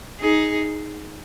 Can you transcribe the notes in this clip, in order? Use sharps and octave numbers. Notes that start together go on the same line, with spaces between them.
D#4 G#4